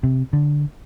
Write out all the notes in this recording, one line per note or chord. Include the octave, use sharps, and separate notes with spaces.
C3
D3